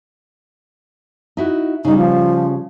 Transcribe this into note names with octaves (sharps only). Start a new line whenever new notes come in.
D#4 E4 F#4
C#3 G3 D#4
F3